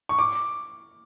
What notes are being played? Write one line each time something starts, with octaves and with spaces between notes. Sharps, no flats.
C#6
D6